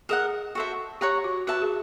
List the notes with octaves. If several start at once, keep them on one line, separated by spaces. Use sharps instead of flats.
G#4 A#4 D#5 F#5
F#4 A4 C5 E5
G4 C#5 F#5 A#5 C#6
F#4
F#4 B4 E5 A5
G#4